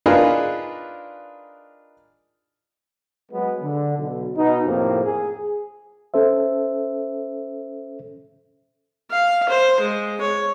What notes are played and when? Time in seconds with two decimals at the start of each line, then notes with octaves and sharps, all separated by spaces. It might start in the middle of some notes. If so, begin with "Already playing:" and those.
0.06 D4 D#4 F4 G#4 A#4 B4
3.32 F#3 G#3 B3
3.63 D3
3.98 B1
4.37 B2 D#4
4.66 F2 A2 C3 A#3 C4
5.04 G#4
6.14 C#4 A4 C5 E5
9.11 F5
9.49 C5
9.80 G#3
10.21 C#5